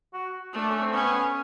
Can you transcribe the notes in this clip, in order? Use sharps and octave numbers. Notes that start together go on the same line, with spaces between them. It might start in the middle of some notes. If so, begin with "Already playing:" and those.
F#4
A3 D4
C#4
C4
B3 C#4